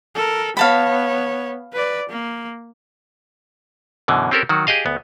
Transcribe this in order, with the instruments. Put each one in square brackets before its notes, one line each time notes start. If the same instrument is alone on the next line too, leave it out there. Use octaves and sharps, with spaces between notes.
[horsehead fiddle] A4 A#4
[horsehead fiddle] B3 C#5 [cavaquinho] F5 A5 B5
[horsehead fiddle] B4 D5
A#3
[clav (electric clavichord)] F#2 B2 D3 E3
C4 C#4 G4 A4 A#4
D#3 F#3 F#4
G4 G#4 D#5 F5
D2 B3